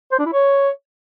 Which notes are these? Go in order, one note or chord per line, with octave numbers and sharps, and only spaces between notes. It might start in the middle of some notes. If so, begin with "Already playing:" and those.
C5
D4
E4
C#5